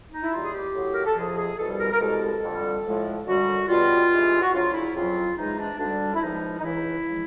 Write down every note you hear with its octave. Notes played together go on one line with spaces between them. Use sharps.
D#4
E4
D#2 D#3 G3 F4
G#4
G4
A2 F#3
A#4
A4
F2 C3 F3 G#4
G#4
C2 B2 G3 A4
A4
A#4
A#4
C2 B2 G#3 A4
F2 D3 G3
A2 F3 G#3
F#2 D3 G3 F#4
C#2 B2 G3 F4
G2 E3 G#3
F#4
D2 C#3 F#3 F4
E4
F2 C#3 F#3 F4
G#2 E3 G#3 D#4
D4
D2 D3 G3 D4
E4
C#2 C3 F3 G#3 D#4
D#4
C#2 C#3 E3 E4
C#3 F3 G#3